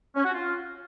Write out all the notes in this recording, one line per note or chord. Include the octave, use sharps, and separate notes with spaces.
C#4
F#4
F4